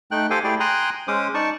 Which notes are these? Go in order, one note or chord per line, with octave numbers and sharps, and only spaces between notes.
A3 D#4 G5 F#6
G4 A4 C5 F5 G5 G#5
A3 E4 G4 G#4 D5 G5
G5 G#5 A#5 C6 D#6 F#6
G#3 C#4 C5 D6 D#6
D#4 D5 A5 C#6